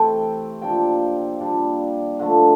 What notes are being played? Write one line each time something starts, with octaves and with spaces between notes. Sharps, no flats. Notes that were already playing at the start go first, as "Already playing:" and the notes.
Already playing: C3 E3 A3 C4 G5 A5
C3 F3 A#3 D4 G5
A#2 G3 D4
D3 F3 A3 D4